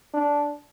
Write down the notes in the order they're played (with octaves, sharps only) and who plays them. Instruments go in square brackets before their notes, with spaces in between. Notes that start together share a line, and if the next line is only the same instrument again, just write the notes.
[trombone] D4